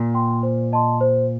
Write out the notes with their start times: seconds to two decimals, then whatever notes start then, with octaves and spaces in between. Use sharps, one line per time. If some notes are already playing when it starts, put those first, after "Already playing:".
Already playing: A#2
0.14 G5 C6
0.43 C5
0.73 D#5 A5 C6
1.01 C5